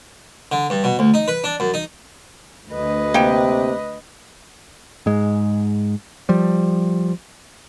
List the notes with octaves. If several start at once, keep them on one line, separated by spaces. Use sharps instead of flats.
D3
G2
B2
D2
D#4
B4
D4
F#2
D#4
D2 B4 D#5
C3 A#3 G5
G#2 G#3
F3 G3